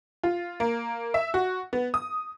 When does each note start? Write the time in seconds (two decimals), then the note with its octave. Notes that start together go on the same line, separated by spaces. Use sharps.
0.23 F4
0.60 A#3
1.14 E5
1.34 F#4
1.73 B3
1.94 D#6